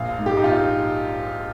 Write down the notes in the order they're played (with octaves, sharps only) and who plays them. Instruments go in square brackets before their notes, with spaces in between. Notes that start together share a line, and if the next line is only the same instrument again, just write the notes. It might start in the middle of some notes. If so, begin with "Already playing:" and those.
Already playing: [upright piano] A#1 F5
G#2
G4
D#4
A#1 F4